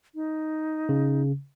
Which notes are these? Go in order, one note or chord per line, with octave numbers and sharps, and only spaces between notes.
D#4
C#3